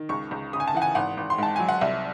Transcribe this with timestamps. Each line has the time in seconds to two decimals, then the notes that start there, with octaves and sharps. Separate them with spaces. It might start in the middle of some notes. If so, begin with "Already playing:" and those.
Already playing: D#3
0.09 C#2 C#6
0.31 C#2
0.53 C#3 D#6
0.60 G#5
0.68 A5
0.75 E3 F#5
0.82 G#5
0.95 G#1 F#5
1.17 G#1
1.30 C6
1.38 G#2 A5
1.56 F#3 G#5
1.68 F#5
1.81 C2 E5